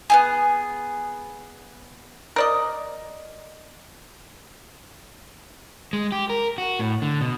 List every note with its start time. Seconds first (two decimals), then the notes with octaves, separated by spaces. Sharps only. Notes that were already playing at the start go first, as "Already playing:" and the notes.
0.10 B3 E4 G#4
2.36 A#4 D5 D#5
5.93 G#3
6.12 G4
6.30 A#4
6.58 F#4
6.79 A2
7.02 D3
7.21 B2